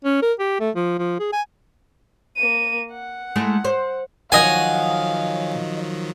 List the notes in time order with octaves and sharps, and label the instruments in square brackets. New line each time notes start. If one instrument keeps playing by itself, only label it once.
[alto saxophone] C#4
A#4
G4
A3
F3
F3
G#4
G#5
[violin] A#3 D#7
F#5
[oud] G#3 A3 E4
C5
[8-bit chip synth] D#3 F3 F#3 [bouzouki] C#5 D#5 F#5 [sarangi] F5 [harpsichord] G#5